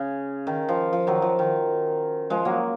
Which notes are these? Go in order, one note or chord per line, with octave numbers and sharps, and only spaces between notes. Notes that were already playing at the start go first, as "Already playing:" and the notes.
Already playing: C#3
D#3
F3
F3
D#3 F#3
F3
D#3
F3 G#3
F#3 A#3